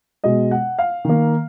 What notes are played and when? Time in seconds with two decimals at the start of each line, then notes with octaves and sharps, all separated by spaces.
0.24 B2 G#3 D#5
0.51 F#5
0.79 F5
1.05 D#3 A#3